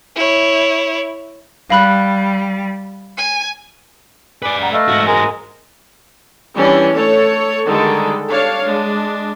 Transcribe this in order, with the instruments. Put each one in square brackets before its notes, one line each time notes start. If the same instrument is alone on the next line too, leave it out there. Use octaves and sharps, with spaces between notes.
[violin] E4 C#5
[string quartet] G3 [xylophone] F5 B5 F#6
[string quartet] G#5
[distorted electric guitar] B4 D5 [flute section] G#5 D6
[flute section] F#5 G5 A#5
[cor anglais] A3 [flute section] D#5 F5 F6
[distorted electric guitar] G#2 F#4
[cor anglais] G#3 [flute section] A#4 G#5
[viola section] E3 G3 C#4 D4 E4
A3 A4 C#5
D3 D#3 G3 G#3 G#4 A4
D4 C#5 F5
G#3 D4